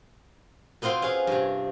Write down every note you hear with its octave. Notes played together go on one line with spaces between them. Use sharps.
B2 B3 C4 F4 C6
C#4 G#4 F5
G2 C3